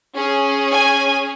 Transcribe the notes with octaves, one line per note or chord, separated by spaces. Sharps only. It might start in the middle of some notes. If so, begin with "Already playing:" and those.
C#4 G#4
G#5